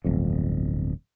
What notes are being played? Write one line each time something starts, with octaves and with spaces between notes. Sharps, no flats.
D1 G1 F2